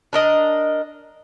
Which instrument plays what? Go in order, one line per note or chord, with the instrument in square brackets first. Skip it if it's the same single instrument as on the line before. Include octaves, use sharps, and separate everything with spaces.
[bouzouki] D4 A#4 D#5